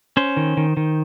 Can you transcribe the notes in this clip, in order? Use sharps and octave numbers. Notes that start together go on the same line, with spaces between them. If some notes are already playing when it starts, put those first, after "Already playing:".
C#4 C5
D#3
D#3
D#3